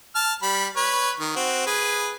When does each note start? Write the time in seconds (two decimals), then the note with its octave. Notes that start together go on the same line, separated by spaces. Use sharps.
0.16 A5 F6
0.43 G3 B5
0.76 B4 C#5
1.20 D#3
1.36 C4 F#4
1.66 G#4 B4